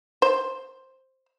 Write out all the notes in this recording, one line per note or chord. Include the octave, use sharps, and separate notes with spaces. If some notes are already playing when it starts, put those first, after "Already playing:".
C5